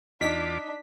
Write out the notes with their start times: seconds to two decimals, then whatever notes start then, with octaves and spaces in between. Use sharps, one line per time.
0.21 E2 D4 D#4 F4 D6 B6